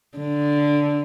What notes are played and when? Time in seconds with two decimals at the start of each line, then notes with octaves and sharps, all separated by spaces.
0.18 D3